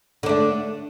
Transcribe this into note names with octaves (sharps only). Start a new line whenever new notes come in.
D3 A3 D4